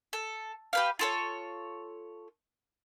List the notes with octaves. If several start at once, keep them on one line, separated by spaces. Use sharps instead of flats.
A4
G4 B4 F5
F4 A4 C#5